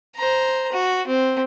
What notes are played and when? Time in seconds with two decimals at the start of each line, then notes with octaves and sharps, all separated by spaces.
0.17 C5 A#5
0.73 F#4
1.07 C4